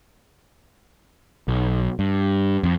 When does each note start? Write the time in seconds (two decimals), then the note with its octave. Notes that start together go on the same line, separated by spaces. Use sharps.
1.48 B1
1.99 G2
2.63 F2